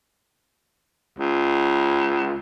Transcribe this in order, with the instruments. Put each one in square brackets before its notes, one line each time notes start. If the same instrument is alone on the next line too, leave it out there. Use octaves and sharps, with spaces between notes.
[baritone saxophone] C#2